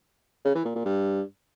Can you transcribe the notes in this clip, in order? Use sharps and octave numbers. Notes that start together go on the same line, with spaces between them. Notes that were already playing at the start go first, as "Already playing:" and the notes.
C#3
E3
A#2
A#2
G2